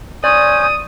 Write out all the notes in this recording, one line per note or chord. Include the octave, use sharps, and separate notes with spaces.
C#4 C5 D5 G#5 D#6